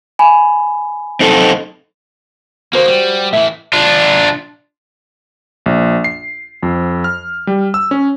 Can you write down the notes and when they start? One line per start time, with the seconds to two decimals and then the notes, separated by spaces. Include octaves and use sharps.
0.19 G#5 B5
1.20 C4 D#4 A4
2.73 D#3 A#3 F#4 C5
2.88 G3
3.33 A2 E3 E5
3.73 D4 F4
5.66 A#1
6.04 C7
6.63 F2
7.04 F6
7.47 G3
7.74 E6
7.91 C#4